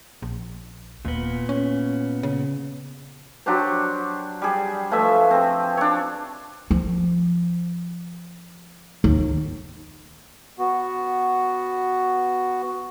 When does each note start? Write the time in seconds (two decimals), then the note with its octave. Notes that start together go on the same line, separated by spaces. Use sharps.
0.22 A#1
1.05 D#1 A#2 B3
1.49 C#4
2.23 C#3
3.46 F#3 D4 G4 C5
4.42 G3 G#4
4.91 F3 A3 B4 E5
5.31 C4 G#4
5.77 D4 C#5
6.71 F3
9.04 D#2
10.59 B3 F#4